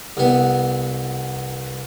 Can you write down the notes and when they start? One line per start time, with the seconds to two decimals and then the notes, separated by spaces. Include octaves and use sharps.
0.17 C2 B3